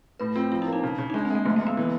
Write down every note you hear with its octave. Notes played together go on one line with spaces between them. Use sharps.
A2 B4
C4 F4
F3 F4
E4
A#3
D#4
C#3
C#3
D#4
G#3 D4
C4
G#3 A#3
F#1 A3
A#3
F#1
B3
E3